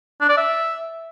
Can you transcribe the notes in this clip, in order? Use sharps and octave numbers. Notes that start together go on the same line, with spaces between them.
D4
D5
E5